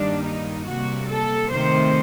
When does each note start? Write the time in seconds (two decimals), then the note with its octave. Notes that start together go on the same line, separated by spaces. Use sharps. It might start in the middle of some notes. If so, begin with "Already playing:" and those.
Already playing: G2 D#3 G3 A#3 D4
0.24 D#4
0.67 C3 G3 A#3 F#4
1.10 A4
1.52 C3 D#3 A3 C5